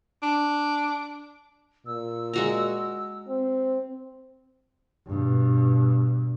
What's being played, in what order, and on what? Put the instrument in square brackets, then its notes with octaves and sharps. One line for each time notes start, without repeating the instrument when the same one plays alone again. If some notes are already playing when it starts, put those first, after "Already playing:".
[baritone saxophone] D4
[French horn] A#2 [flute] E6
[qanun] G#3 F#4 A#5
[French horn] C4
[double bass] G2 B2